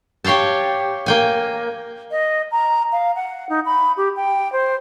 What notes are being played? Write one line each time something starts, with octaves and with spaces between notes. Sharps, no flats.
G4 C#5 F5 G5 A5
A#3 G5 G#5
D#5
A#5
F5
F#5
D#4
B5
G4
G5
C5